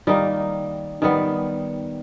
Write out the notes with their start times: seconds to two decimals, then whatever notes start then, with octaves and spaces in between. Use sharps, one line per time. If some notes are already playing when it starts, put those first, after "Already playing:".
0.07 D#3 G3 A#3 D#4
1.02 D#3 G3 B3